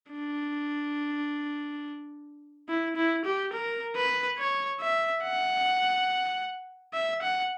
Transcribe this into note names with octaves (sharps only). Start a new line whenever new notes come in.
D4
E4
E4
G4
A#4
B4
C#5
E5
F#5
E5
F#5